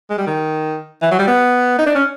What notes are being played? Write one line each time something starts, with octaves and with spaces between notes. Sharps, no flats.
G#3
G3
D#3
E3
F#3
G3
B3
D#4
D4
C#4